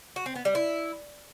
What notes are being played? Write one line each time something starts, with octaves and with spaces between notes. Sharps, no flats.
F#4
C4
B3
G3
E4